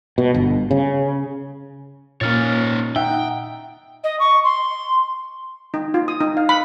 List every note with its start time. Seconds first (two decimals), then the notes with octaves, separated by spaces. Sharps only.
0.18 B2
0.34 G1
0.71 C#3
2.21 A#2 A#3 C#4 D#4 C#5 F6 A6
2.96 D#4 E5 F#5 G5
4.03 D#5
4.19 C#6
4.44 C6
5.74 D#4
5.94 F4
6.08 D#6
6.21 D#4
6.37 F5
6.49 B5